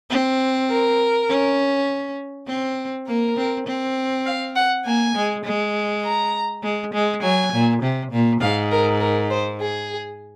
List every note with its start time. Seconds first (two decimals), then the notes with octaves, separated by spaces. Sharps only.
0.10 C4
0.70 A#4
1.29 C#4
2.47 C4
3.08 A#3 A#4
3.37 C4
3.67 C4
4.26 F5
4.56 F#5
4.85 A#3 G#5
5.16 G#3
5.44 G#3
6.03 A#5
6.63 G#3
6.93 G#3
7.22 F#3 G#5
7.52 A#2
7.82 C3
8.12 A#2
8.41 G#2 F5
8.71 A#4
9.00 A#4
9.30 C5
9.61 G#4